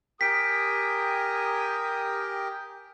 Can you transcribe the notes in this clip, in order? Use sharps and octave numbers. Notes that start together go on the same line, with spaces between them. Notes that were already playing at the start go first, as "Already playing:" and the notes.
G4 A#4 G5 G#5 D#6 B6 D7